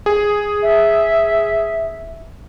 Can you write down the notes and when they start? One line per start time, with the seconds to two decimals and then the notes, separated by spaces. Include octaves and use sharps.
0.06 G#4
0.63 E5